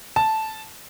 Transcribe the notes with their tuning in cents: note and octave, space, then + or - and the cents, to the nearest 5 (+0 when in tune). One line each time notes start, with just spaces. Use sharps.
A5 -5